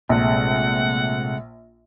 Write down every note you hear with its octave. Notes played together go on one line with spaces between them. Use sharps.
A#1 C3 G#3 A3 F#5